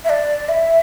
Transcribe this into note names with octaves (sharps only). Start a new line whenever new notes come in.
E5
D5
E5